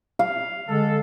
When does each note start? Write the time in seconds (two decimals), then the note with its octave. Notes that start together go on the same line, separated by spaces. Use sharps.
0.19 F5
0.69 D3 G#3 A4